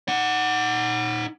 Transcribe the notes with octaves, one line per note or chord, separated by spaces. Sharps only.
D#4 F#5